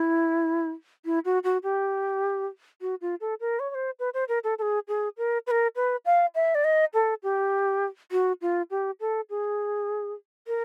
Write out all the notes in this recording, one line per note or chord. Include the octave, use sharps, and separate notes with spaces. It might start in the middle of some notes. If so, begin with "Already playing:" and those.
Already playing: E4
E4
F#4
F#4
G4
F#4
F4
A4
A#4
C#5
C#5
C5
B4
C5
A#4
A4
A4
G#4
G#4
A#4
B4
A#4
B4
F5
E5
D5
D#5
A4
G4
F#4
F4
G4
A4
G#4
A#4